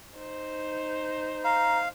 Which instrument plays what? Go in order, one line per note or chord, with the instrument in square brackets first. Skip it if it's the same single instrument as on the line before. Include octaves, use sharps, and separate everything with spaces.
[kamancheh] D#4 C5
[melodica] F5 [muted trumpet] A#5